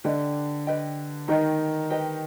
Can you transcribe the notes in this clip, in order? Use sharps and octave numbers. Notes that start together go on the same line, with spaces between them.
D3 D4 G4 B4 D#5 G5
G4 B4 D#5 G5
D#3 D#4 G4 B4 D#5 G5
G4 B4 D#5 G5